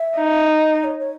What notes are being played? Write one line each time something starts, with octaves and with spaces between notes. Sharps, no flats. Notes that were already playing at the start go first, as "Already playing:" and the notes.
Already playing: E5
D#4
D#5
C#5
C#5